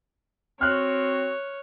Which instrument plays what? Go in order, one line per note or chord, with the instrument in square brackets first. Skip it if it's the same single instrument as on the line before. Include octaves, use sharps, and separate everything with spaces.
[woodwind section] C4 F#4 [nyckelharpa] C#5 [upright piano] F6 F#6